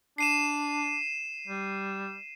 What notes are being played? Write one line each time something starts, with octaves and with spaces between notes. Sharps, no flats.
D4 C7 D#7 E7
G3